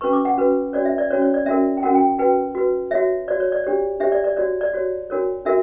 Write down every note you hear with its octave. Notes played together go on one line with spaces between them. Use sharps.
C#4 F#4 B4 C#6
D6
F#5
C#4 F#4 B4
C#4 F#4 C#5 D5
E5
D5
C#4 F#4 C#5
C#5
D5
C#4 F#4 A#4 E5
G5
C#4 F#4 A#4 F#5
G5
F#4 B4 G5
F#4 B4
F#4 C#5 E5
F#4 C#5 D5
C#5
D5
D4 G4 C#5
D4 G4 C#5 E5
D5
D5
F#4 C#5 D5
D5
F#4 C#5
D4 F#4 A#4 C#5
D4 F#4 A#4 E5